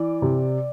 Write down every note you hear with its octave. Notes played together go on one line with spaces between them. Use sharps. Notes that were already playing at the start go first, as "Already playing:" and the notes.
Already playing: E3 D5
C3